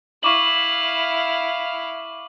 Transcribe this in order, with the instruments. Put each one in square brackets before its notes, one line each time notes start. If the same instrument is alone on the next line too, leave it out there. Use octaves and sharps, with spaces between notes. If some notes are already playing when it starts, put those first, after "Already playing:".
[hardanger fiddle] E4 F5 [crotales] C#6 D6 F#7